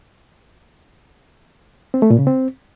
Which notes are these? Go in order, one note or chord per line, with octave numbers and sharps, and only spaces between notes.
C4
A3
A#2
C#3
C4